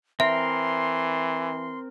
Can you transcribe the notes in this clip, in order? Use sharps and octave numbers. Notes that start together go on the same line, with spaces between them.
E3 C4 A#4 E5 C6